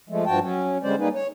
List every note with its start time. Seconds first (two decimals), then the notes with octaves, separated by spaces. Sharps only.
0.09 F3 G#3 A3
0.26 G2 F3 F#4 G5 A5
0.40 F#3 C#4
0.83 D3 G3 G#3 C#4 C5 D5
0.98 G3 A#3 D#4 G#4 B4
1.14 C#5